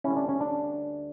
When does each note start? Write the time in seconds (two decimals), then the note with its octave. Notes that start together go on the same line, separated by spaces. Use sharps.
0.04 D2 D3 G3 C#4 E4
0.17 D4
0.29 C#4
0.41 D4